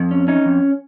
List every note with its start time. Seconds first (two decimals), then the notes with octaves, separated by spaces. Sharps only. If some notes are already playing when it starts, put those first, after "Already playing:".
Already playing: F2
0.11 C#4
0.28 C#4 D#4
0.46 F2